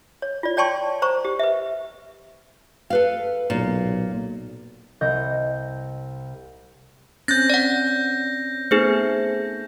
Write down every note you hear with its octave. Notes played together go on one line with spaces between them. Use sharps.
C#5
F4 D5
C#5 D5 G5 A5 C6 C#6
C5 A#5 C#6
G4
B4 E5
A4 B4 F5
B1 A#2
C2 D#5 G6 A#6
C4 C#4 F#6 G6 A6 A#6
D5 F#5
A3 B3 D#4 G#4 C5